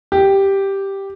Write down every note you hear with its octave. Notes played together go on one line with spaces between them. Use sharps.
G4